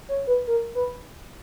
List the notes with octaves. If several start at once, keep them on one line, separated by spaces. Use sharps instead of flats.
C#5
B4
A#4
B4